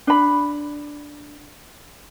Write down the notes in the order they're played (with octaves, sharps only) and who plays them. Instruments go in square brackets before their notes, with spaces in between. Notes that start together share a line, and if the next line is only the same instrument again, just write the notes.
[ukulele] D4 B5